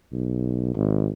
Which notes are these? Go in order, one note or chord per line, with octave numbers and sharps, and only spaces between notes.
B1
G#1